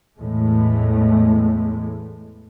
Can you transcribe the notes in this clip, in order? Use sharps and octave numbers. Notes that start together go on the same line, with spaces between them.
E2 A2 E3 G#3 A3